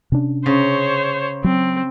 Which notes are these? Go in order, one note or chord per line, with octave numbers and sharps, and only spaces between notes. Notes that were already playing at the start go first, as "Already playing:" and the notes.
C3 C#4 D4
C#3 C5 C#5
F#3 C4